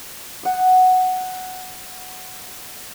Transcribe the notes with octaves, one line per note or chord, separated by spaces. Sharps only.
F#5 D#6